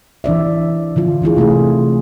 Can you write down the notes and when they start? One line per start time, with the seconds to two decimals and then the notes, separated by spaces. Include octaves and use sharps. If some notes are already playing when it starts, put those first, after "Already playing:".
0.24 E3 D4 D5 E5
0.96 D3 F3 F4
1.22 E3 E4 F4 G#4
1.37 C3 A3 D4 G#4